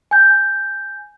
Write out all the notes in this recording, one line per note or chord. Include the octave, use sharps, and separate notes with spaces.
G#5 G6